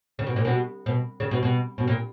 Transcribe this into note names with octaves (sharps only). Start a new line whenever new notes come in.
C#3
B2
A#2
B2
B2
C#3
B2
B2
B2
A#2